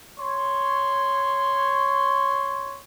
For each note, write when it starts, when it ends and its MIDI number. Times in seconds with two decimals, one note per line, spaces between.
0.19 2.79 73
0.19 2.79 84